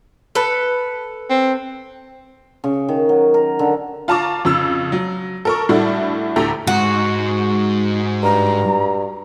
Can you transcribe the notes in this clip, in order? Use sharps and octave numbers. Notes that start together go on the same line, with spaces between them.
A4 B4
C4
C#3
D#3
F#3
A#4
D3
F4 F5 A5 A#5 C#6 D6
F2 C#3 E6
F#3
A4 A#4 C#6
A2 G3 A3 D4 E4 F#4
D2 A2 G4 A4 A#5
G#2 D#4 F#4
G2 A#5